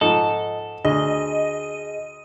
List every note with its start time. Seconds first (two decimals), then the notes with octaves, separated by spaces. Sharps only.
0.01 G#2 F3 A4 D#5
0.85 D2 G#4 D#5